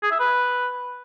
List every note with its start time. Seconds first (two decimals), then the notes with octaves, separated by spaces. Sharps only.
0.03 G#4
0.11 E5
0.20 B4